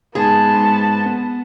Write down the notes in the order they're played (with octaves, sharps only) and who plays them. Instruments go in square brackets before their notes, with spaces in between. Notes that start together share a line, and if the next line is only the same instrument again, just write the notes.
[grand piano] G#2 [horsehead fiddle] B3 A5 [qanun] G#4
[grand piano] G#2
B3